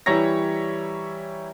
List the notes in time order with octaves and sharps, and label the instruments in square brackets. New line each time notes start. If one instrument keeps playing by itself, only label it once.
[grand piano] E3 G3 E4 C#5 A#5 A#6